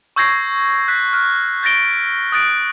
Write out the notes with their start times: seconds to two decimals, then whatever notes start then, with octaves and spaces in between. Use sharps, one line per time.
0.16 C#6 E6 G6 G#6 A#6 C7
0.88 F#6 B6
1.13 F6 F#6
1.63 G6 A6 A#6 D7 G7
2.32 D#6 F#6 A6 D7